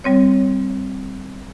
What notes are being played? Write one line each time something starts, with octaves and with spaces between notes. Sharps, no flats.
G3 C4 C#5